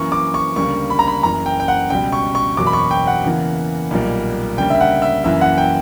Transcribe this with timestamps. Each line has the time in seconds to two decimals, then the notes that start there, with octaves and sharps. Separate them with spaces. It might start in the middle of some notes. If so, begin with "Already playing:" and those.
Already playing: F#2 E3 A#3 C#6
0.12 D6
0.34 C#6
0.56 D2 C#3 G3 A#3 C#6
0.90 B5
0.99 A#5
1.08 B5
1.23 F#1 F#2 E3 A#3 A#5
1.46 G5
1.60 G5
1.68 F#5
1.90 C#2 B2 G3 G5
2.12 C#6
2.35 C#6
2.57 F#1 E2 B2 F#3 A#3 D6
2.67 B5
2.73 C#6
2.91 G5
3.07 F#5
3.24 E2 C#3 E3 A#3
3.91 B1 A#2 G3 A#3
4.57 D2 C#3 G3 A#3 G5
4.70 E5
4.81 F#5
5.02 E5
5.24 F#1 F#2 E3 A#3 E5
5.41 F#5
5.58 G5